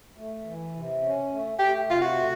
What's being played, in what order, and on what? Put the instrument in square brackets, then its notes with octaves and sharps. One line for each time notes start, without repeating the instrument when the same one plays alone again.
[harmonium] A3
E3
C3
C#4
A3
[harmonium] A3 [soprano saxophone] G4
[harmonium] C3 [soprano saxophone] F4
[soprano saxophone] F#4
[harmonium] A3